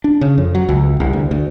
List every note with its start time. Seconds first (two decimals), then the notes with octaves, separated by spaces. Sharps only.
0.04 D4
0.21 C#3
0.38 F2
0.55 F#3
0.69 C#2
1.00 C2
1.13 D2
1.31 D2